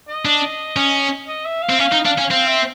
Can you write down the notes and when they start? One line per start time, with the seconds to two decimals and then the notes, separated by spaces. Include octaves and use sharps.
0.08 D#5
0.25 D4
0.76 C#4
1.27 D#5
1.45 E5
1.62 F5
1.70 C4
1.79 C#4 F5
1.92 D#4
2.05 D4 F5
2.18 C#4
2.31 C4 F5
2.47 E5